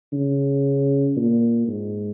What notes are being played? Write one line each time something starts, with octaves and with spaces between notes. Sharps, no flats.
C#3
A#2
G#2